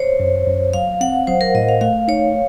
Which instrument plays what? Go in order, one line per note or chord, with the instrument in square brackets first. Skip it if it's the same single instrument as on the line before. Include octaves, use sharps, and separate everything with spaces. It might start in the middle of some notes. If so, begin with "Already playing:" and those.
Already playing: [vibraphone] C5 C#5
[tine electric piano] F#2
F#2
[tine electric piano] F#3 [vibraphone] F5
[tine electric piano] C4 [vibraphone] F#5
[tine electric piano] F#3 [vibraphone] C5
[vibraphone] A#4
[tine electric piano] A2 [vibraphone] D#5
[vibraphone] F5
[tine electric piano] A3 [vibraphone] F5
[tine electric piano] D#4 [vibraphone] C#5